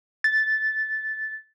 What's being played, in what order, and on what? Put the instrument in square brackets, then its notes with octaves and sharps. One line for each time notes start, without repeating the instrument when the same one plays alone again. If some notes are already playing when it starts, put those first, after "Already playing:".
[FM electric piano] A6